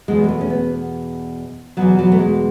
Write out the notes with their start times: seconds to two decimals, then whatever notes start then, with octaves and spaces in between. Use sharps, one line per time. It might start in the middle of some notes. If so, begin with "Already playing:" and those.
0.08 E2 B2 G#3
0.24 G#3
0.29 A3
0.41 C#4
0.50 B3
1.77 E2 B2 F#3
1.99 F#3
2.12 A3
2.19 G#3